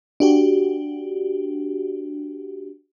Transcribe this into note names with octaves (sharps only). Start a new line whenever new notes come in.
D4 F#4 G4